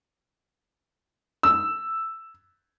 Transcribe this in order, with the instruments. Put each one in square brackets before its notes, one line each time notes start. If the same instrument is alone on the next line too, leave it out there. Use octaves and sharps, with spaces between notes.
[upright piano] E6